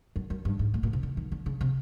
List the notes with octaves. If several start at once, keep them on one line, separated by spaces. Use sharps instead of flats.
F#2
F#2
G2
G#2
A2
A#2
C3
D3
D#3
D3
C#3
C3